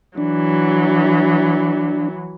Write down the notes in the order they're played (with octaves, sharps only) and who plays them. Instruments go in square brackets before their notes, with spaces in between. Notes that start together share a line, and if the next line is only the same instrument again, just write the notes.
[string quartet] E3 F#3 [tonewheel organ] D4